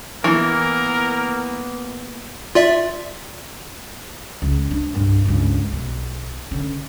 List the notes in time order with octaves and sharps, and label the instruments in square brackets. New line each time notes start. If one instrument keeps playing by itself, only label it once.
[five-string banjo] E3 [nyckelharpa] A#3 B3 [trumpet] A#4
[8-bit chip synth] F4 D5 E5
[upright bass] C#2
D4
C2 G2
C#2 G2
B1
D3 C#4